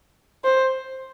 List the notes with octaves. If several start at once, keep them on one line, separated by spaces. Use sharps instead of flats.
C5